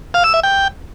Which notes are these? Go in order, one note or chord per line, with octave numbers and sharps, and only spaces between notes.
F5
E6
E5
G5